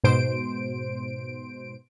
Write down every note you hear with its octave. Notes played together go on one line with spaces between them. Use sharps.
G#2 B2 C5 D7